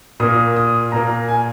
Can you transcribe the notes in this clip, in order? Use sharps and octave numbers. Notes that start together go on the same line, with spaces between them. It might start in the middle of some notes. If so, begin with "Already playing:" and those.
A#2 A#3 D#6
D#6
A#2 A#3 A#5
G#5